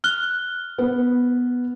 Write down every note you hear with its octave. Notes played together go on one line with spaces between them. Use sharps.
F6 F#6 G7
B3